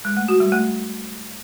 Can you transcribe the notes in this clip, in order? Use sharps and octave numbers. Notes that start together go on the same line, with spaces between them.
G#3
A3
F#4
G3
A3